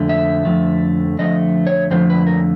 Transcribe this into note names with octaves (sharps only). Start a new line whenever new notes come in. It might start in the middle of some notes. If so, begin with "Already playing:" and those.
Already playing: F2 D3 A3
E5
F2 D3 F3 A3
F2 D3 F3 A3 D#5
C#5
F2 D3 F3 A3 C5
B4
A#4